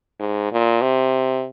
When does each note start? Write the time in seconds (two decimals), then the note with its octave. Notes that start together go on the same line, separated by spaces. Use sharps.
0.20 G#2
0.52 A#2
0.81 C3